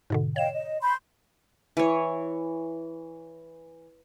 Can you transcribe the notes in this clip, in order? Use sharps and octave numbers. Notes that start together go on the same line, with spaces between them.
G#2 B2 D3
C#5 D#5 F5 G5 E7
D#5
B5 C6 G6
E3 C#5